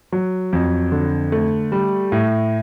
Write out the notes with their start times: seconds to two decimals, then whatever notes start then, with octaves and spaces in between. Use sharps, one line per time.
0.12 F#3
0.53 F2
0.92 D3
1.32 A3
1.72 G3
2.12 A2